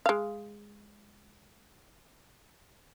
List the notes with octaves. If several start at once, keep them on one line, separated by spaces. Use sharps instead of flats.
G#3 F5